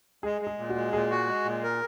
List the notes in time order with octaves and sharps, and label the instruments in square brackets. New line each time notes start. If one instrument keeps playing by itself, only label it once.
[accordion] G#3 [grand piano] G#4
[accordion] G#3
[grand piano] G#4
[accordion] A#2
[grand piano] F#4
[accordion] G#3
[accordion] A#2 [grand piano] G#4
[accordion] F#4
G#3
A#2
A#4